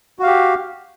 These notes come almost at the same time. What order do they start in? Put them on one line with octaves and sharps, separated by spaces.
F#4 F5 G4